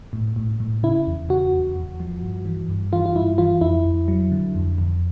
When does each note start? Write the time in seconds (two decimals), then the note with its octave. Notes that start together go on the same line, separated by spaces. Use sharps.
0.13 A2
0.36 A2
0.60 A2
0.83 C#3 E4
1.07 E2
1.29 C#3 F#4
1.53 E2
1.76 E2
2.00 F3
2.22 G2
2.45 E3
2.69 G2
2.93 E3 F4
3.06 F4
3.15 G2 E4
3.38 E3 F4
3.61 F2 E4
3.85 F2
4.08 F#3
4.32 D3
4.55 F2
4.78 F2